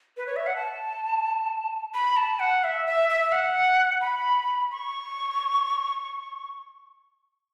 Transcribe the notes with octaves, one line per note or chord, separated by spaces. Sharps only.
B4
C#5
E5
F#5
A5
B5
A5
F#5
E5
E5
E5
F#5
B5
C#6